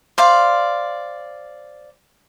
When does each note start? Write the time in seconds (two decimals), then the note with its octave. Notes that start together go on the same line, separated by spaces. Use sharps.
0.18 C5 D5 F5